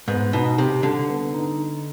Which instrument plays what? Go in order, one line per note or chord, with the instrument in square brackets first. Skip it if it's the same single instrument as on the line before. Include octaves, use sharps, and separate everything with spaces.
[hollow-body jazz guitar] G#2 [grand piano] B3
[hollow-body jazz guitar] B2 [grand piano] D#4
[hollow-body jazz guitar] C3 [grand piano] G4
[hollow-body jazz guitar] D3 [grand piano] G3
[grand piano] B3
D#4